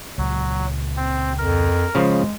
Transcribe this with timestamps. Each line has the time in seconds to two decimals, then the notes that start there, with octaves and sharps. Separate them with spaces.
0.18 C#2 A#2 F#3
0.97 C4
1.38 F2 A#4
1.95 C#3 F3 G#3